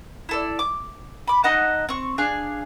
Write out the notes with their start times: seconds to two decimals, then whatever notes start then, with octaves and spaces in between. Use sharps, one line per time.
0.29 E4 A4 D5
0.59 D6
1.28 B5 D6
1.44 D#4 D#5 F#5 A5
1.89 C4 C#6
2.18 D4 G#4 F5 G#5